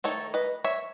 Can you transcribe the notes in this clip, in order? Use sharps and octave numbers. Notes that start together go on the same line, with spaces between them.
D#3 A3 D#4 A4 C#5
B4 D#5
C#5 E5